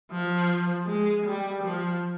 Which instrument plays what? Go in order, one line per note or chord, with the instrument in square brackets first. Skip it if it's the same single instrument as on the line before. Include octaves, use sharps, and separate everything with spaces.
[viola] F3
G#3
G3
F3